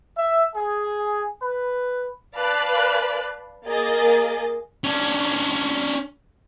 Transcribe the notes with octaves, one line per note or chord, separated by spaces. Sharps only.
E5
G#4
B4
B4 D5 F5 A5 B5 F#6
A#3 G#4 A#4 D#5 A6
C#4 D4